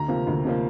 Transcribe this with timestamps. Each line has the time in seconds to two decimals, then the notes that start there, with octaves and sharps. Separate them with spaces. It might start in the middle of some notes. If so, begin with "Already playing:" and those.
Already playing: D2 A#5
0.08 C3 F3 A#3
0.27 D2
0.45 C3 F3 A#3